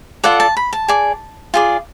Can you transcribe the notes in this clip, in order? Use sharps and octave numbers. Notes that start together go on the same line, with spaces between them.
F4 A4 D5 F#5
A5
B5
A5
G#4 D5
F4 G#4 D5